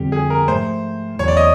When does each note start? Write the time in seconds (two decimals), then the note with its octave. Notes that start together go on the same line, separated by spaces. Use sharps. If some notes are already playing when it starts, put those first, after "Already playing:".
Already playing: F2 D3 G3 C4 G4
0.12 G#4
0.30 A#4
0.48 G#2 F3 A3 C5
1.19 E2 C#3 F#3 C#5
1.28 D5
1.37 D#5